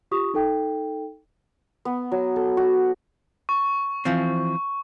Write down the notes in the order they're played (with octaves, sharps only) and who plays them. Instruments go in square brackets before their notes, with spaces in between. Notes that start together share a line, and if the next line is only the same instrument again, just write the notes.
[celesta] F4 G4 C#6 D#6
D#4 A4 G5
[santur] B3
F#3
A4
F#4
[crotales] C#6
[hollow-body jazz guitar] E3 F3 C4